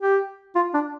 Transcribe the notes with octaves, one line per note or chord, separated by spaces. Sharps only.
G4
F4
D4